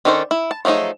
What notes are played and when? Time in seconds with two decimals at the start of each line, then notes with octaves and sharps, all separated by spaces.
0.05 D#3 C#4 D4 A4 C5
0.31 E4
0.51 A5
0.65 F3 F#3 A3 D#4 G#4